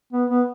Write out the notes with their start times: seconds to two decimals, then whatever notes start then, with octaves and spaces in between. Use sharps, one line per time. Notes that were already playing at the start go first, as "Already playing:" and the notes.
0.13 B3
0.30 B3